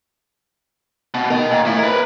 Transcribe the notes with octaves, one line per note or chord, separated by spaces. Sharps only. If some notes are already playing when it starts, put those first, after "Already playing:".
B2
A#4 D#5
A#2
A2 E4
A#4 B4